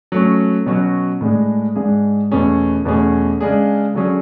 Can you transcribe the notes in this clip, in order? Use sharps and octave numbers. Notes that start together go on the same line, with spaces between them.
F#3 A3 C#4
B2 F#3 C#4 F#4
A2 G#3 D4 G#4
G#2 G#3 D4 G#4
E2 B2 A3 C#4 G#4
E2 B2 A3 C#4 G#4
C#3 G#3 D4 G#4
D3 F#3 C#4 G#4